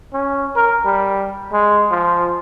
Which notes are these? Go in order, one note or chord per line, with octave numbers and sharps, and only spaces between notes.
C#4
A#4
G3
G#3
F3